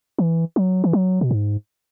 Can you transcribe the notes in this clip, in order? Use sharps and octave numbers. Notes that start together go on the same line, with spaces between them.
E3
F#3
E3
F#3
B2
G#2